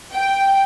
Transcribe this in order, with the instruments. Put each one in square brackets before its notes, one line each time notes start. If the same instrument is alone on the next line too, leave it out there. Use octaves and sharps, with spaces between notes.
[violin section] G5